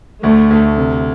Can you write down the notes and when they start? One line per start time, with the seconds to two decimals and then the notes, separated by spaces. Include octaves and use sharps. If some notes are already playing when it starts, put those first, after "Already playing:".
0.23 D2 A3
0.51 D2
0.77 C3